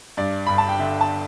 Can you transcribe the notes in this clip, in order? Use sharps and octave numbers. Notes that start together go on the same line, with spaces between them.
G2 D5
G1 B5
A5
G5
D3 E5
A5